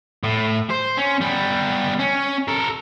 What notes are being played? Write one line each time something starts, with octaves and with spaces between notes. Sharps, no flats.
A2
C5
C#4
G3 B3
C#4
A4 A#4